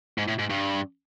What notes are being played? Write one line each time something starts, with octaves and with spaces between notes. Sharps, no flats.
G#2
A2
G#2
G2